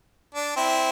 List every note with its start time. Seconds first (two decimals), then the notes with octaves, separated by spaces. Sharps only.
0.35 D4
0.56 C4 E4